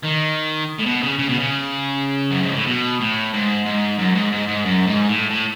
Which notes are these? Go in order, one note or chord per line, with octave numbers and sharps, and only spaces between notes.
D#3
A2
B2
C#3
C#3
B2
C#3
F#2
G#2
A2
B2
A2
G#2
G#2
F#2
G#2
G#2
G#2
F#2
G#2
A2
A2